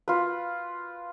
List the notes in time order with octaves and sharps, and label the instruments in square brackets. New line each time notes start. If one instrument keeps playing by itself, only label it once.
[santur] F4 B4